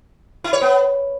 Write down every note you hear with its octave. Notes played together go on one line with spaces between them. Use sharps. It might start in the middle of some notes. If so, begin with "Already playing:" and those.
E4
C#5
B3